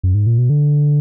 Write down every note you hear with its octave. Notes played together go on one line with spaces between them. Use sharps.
F#2
G#2
A#2
B2
D3